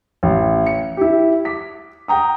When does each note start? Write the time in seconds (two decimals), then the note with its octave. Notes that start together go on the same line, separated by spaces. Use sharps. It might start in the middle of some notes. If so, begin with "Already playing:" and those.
0.23 A1
0.66 C#7
0.97 E4 G4
1.45 D6 B6
2.08 F#5 G5 A#5 D#6